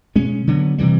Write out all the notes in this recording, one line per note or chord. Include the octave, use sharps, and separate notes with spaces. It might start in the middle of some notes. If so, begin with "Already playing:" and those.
B2 G#3 C#4
D3 F#3 B3
C3 E3 G3